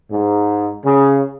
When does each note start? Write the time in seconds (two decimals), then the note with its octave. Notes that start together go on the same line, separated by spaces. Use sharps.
0.12 G#2
0.85 C#3